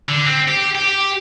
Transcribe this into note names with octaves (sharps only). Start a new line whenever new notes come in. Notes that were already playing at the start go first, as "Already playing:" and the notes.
D3
C4
G4
G4